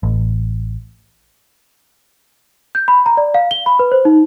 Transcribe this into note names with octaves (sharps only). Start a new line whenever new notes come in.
A1
G6
B5
A#5
D5
F5
G7
B5
B4
C5
D#4